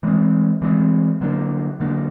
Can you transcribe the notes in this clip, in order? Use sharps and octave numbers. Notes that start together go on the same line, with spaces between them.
E3 G#3 C4
E3 G#3 C4
D3 F#3 A#3 D4
D3 F#3 A#3 D4